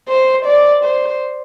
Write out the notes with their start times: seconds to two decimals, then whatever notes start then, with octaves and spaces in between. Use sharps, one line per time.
0.08 C5
0.46 D5
0.84 C5